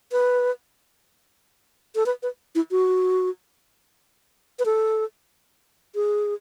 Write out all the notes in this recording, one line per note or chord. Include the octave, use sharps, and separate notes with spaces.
B4
A4
B4
B4
E4
F#4
B4
A4
G#4